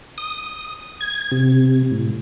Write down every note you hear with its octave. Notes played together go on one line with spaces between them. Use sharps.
D#6
G#6
C3
A2